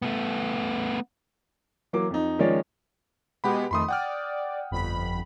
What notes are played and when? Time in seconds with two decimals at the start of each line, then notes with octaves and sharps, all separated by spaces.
0.02 A3 B3
1.93 E3 F#3 A#3 D6
2.10 F2 D#4
2.39 D#3 F3 G#3 C#4 C#5 D5
3.44 B2 G#3 B3 G4 F#5 B5
3.71 F2 D#3 A3 B5 C6 D#6
3.88 D5 F#5 G5 F6
4.71 G1 F2 B5